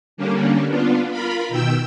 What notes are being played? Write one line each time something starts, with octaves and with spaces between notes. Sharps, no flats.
D3 G3 A#3 C#4 D4
B3 D4 F4
F4 A#4 B5
B2 D#3 G5 E6